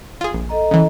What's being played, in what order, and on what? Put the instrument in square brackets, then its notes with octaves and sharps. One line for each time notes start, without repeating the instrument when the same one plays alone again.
[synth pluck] F4 G#4
A#1
[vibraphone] A4 D#5 A#5
[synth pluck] C#3 E3